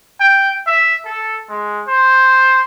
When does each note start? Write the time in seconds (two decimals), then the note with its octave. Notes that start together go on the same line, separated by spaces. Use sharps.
0.20 G5
0.67 E5
1.05 A4
1.49 G#3
1.87 C5